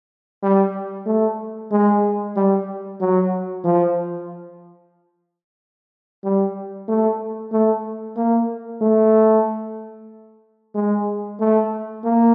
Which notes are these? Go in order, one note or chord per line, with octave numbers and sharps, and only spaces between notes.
G3
A3
G#3
G3
F#3
F3
G3
A3
A3
A#3
A3
G#3
A3
A#3